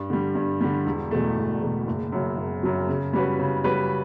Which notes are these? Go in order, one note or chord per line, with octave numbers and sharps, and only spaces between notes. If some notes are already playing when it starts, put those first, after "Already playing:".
Already playing: G2
D3 G3
G2
D3 G3
E1
E2 B2 A3
E1
E2 B2 A3
F#1
F#2 C#3 F#3
F#1
F#2 C#3 F#3
C#3
G3 C#4 F#4 B4
C#3
G3 C#4 F#4 B4